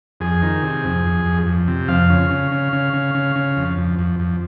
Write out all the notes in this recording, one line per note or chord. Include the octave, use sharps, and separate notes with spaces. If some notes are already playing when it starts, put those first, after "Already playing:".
F2 G#4
D#3
C3
F2
F2
F2
F2
C3
F2 F5
C#3
C#3
C#3
C#3
C#3
C#3
C#3
F2
F2
F2
F2